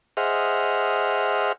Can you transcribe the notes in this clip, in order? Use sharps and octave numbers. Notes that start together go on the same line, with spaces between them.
G#4 C5 D#5 E5 F#5 F6